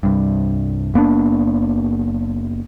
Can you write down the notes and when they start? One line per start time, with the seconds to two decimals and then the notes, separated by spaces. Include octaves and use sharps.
0.03 C2 G2
0.94 F#1 A#3 B3 D4